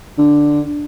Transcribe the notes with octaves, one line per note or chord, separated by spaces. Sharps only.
D3